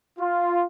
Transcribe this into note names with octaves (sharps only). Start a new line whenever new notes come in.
F4